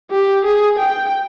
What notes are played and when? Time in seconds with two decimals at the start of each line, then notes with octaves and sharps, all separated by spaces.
0.10 G4
0.45 G#4
0.79 G5